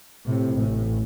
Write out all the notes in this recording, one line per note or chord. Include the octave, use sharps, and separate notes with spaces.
A2 C3
A1 A2